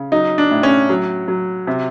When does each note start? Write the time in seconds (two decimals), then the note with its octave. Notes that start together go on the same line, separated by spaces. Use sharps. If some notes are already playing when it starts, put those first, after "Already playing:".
Already playing: C#3
0.12 F#3 D#4
0.38 D4
0.51 A2
0.63 C#4
0.89 F#3
1.28 F#3
1.67 C3